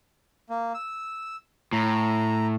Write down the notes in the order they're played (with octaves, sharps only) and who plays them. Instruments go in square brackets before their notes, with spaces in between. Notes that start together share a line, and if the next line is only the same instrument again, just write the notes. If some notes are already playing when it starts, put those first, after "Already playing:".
[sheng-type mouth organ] A#3
E6
[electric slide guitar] A2 [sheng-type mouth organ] A#5